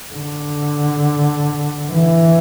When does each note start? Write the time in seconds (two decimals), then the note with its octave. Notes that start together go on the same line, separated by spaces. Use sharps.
0.14 D3
1.92 E3